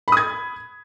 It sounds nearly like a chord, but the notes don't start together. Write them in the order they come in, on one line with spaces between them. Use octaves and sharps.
B5 D#6 G#6